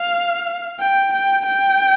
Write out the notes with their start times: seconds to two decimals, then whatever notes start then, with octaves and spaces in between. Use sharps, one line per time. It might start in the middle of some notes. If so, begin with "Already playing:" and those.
Already playing: F5
0.80 G5
1.13 G5
1.46 G5